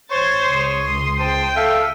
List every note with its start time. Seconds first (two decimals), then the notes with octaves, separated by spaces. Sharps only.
0.11 A1 C5 C#5 C6 C#6 G#6 A6
0.48 C#2 D#6
0.82 C6
1.19 C5 G5 A5 C6
1.56 A4 E5 F5